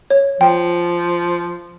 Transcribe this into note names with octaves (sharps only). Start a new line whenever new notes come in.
C#5
F3 G5